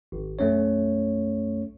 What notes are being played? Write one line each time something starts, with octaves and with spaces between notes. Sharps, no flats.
G#1
B1 F#2 A3 C#4 C#5